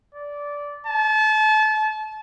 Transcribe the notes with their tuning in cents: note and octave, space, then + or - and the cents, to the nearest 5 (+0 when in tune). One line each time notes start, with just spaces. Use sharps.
D5 -15
A5 -30